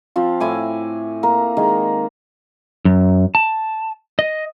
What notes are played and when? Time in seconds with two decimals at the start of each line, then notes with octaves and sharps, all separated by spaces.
0.16 F3 C4 F4
0.40 A2 E4 G#5 D6
1.23 A#3 A#4
1.57 D#3 G#3 A#4
2.85 F#2
3.35 A5
4.19 D#5